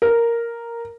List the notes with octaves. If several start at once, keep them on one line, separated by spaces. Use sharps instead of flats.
A#4